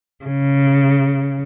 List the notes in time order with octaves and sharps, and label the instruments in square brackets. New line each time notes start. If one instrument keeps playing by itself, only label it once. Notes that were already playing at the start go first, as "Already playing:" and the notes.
[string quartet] C#3